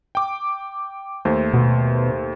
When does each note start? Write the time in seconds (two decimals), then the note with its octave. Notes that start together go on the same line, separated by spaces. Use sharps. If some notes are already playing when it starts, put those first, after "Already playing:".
0.15 G5 D6
1.25 D#2 A3 C5
1.54 B2